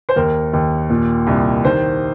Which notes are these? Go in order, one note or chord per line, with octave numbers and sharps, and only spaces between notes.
C5
D#2 A#4
D#2
A#2
C2
D#3 C5